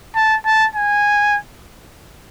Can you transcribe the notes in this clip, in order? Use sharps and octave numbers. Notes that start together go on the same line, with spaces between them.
A5
A5
G#5